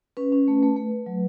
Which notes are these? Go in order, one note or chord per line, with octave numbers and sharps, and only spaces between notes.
C#4 B4
C#4
A3
A3
A3
A3
F#3